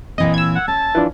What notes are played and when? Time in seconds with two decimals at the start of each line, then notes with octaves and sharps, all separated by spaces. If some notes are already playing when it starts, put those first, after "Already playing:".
0.18 A#2 E3 C4 D#5
0.34 E6 G#6
0.56 F#5
0.68 C#4 A5
0.95 E3 F3 D4